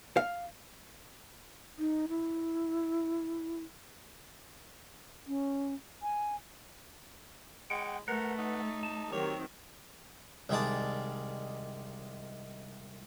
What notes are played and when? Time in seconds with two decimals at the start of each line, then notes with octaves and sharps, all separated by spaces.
0.17 F5
1.79 D#4
2.09 E4
5.28 C#4
6.02 G#5
7.70 G#3 F#5 G5
8.08 A3 A#4 B4 F#5
8.38 D#4
8.83 A5
9.12 D#3 F#3 C4 G4 C#5
10.49 C2 D#3 G#3 D5 A5